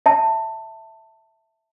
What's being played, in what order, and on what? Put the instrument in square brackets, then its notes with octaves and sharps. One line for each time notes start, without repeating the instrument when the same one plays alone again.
[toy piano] E5 A5